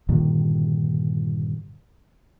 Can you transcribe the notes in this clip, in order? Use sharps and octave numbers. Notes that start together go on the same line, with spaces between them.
G2 A#2 D3 D#3